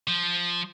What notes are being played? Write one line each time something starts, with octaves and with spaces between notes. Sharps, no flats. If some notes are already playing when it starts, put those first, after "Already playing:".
F3